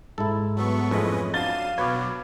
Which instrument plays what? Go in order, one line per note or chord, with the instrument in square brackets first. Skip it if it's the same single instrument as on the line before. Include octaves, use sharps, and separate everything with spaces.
[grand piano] G#2 [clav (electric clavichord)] E4 A4
[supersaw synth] F#3 B3 C#6 [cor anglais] A3
[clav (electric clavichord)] F2 A2 G#3 [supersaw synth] C#4 B4 D#5
[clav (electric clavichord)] F#3 D4 [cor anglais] F5 [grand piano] A6 G7 [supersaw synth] C7 D#7 E7
[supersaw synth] B2 F#3 [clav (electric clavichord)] B4 C#5 [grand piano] D6 G#6